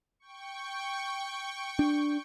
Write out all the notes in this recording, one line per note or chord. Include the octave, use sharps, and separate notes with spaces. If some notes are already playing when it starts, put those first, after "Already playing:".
G5 C#6
D4